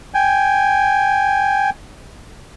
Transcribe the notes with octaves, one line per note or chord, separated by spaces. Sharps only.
G5 G#5